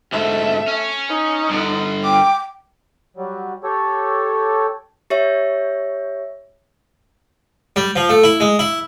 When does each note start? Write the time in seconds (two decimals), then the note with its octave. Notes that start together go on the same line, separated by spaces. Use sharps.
0.12 D2 G#2 A3 E5
0.68 C#4
1.09 D#4
1.49 G2 D3
2.04 G5 D6
3.17 F#3 G3
3.64 G4 A4 C#5
5.10 G4 C#5 E5
7.76 G3
7.96 F3
8.09 A3
8.24 E4
8.40 G#3
8.59 E4